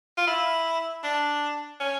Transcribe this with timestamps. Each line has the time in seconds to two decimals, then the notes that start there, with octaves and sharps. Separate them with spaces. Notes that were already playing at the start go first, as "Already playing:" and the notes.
0.18 F4
0.27 E4
1.04 D4
1.80 C#4